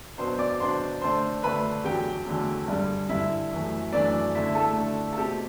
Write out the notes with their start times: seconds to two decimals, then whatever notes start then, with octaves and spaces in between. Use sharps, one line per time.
0.18 B2 F#3 B3 D4 C5 C6
0.39 D5 D6
0.60 B2 F#3 B3 D4 C5 C6
1.02 D3 A3 D4 C5 C6
1.43 D3 A3 D4 B4 B5
1.84 E2 D3 F#3 A3 G4 G5
2.26 E2 D3 F#3 A3
2.68 G2 D3 G3
3.09 G2 D3 G3 E4 E5
3.51 F#2 E3 A3
3.93 F#2 E3 A3 D4 D5
4.35 D3 A3 D4 E4 E5
4.55 A3 A4
4.76 D3 A3 D4
5.13 A4
5.18 B2 A3 C4 G4